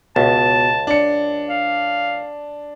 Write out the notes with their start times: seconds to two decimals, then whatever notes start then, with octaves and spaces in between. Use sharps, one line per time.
0.16 C#2 B2 A5
0.87 D4 C#7
1.49 F5